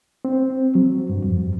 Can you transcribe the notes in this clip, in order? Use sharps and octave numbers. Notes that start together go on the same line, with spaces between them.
C4
F#3
G2
F2